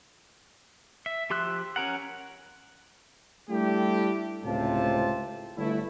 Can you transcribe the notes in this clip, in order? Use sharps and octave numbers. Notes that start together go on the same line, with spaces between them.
E5
F3 G4 C6 E6 F#6
C#4 A#4 F#5
G3 A3 D4 E4 G4
C#2 A2 C3 C4 F4 A5
G1 A3 E4